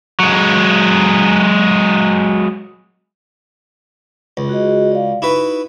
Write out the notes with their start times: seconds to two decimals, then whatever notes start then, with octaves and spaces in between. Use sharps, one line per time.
0.20 F#3 G#3
4.37 C#2
4.49 F#4 G#4 D#5
4.92 D5 F5
5.22 D#4 E4 F#4 B4